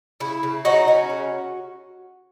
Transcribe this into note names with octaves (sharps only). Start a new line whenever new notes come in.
C#3 E4
C#3
F#3 D#4 F#4
C#4
C#3